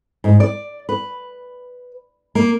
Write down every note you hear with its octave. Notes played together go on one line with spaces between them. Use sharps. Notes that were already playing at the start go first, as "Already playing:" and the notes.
G#2
D5
B4
A#3